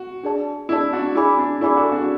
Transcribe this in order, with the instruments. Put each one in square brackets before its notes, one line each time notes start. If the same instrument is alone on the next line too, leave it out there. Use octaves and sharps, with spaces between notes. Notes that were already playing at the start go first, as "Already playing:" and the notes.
Already playing: [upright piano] F#4
[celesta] D4 G#4 D5 A5
[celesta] D4 G#4 D5 A5 [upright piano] E4
[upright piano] D4 F#4
[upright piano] E4 [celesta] G#4 D5 G#5 B5 D6
[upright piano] D4
[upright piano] E4 [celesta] G#4 D5 G#5 B5 D6
[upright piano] F#4 A4
D4 F#4